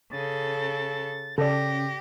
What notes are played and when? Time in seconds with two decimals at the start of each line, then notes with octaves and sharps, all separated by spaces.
0.12 C#3 A4 A6
1.38 C#3 G4 A4 D5 A#6